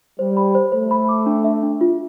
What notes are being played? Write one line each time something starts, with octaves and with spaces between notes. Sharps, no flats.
G3 C5
B5
C5
A3 C5
B5
D6
D4
E5
D4
F4